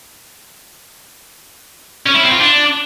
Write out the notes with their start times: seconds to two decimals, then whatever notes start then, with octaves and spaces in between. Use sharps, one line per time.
2.06 C#4
2.15 E4
2.23 C4
2.31 F4
2.39 D4